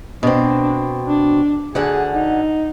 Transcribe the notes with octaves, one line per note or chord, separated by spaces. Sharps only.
B2 C4 D4
D4
D2 D3 G#4 F#5
D#4